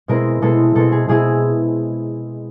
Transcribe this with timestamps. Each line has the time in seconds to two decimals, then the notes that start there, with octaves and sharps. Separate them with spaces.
0.08 B2 G#3 C4 E4 A#4
0.42 B2 G#3 C4 E4 A4
0.75 B2 G#3 C4 E4 A4
0.92 G#4
1.08 B2 G#3 C4 E4 G#4